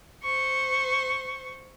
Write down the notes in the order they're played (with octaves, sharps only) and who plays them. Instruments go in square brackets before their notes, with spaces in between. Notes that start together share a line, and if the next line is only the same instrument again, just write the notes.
[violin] C5 C#6